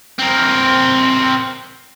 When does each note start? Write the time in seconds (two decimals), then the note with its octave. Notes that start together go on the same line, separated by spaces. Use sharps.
0.19 C4 A#4